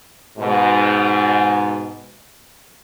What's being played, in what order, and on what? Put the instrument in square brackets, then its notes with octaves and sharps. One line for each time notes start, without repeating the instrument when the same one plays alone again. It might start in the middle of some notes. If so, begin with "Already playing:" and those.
[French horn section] G#2 B2